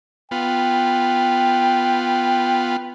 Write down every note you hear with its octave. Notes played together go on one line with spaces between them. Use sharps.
B3 F4 G5